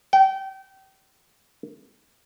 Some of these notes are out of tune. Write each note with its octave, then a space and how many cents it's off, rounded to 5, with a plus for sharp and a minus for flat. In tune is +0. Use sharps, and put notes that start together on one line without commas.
G5 -30